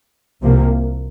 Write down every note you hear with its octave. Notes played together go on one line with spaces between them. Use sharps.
C2 C3 F3 A#3